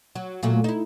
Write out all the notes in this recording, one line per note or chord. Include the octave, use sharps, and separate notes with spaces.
F#3
A#2 F#3 A3
D#4 E4